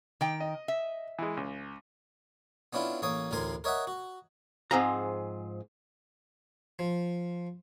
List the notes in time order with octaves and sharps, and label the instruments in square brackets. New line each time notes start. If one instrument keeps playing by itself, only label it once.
[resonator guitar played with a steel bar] D#3 G5
[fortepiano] D#5
[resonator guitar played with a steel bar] E5
[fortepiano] E3 G#3
C#2
[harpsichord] B3 C#4 D4 E4 F4
A1 A#3 C#5 D#6
A1 D2 A2 A#4 G#5 C6
A#4 C#5 D#5 E5 F#5
F#4
[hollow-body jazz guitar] G#2 F3 C4 G#4 F5 A#5
[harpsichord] F3